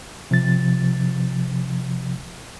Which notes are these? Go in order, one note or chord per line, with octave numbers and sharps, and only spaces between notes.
C3 F3 A6